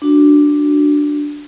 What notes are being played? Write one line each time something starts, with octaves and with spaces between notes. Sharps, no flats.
D4 F#4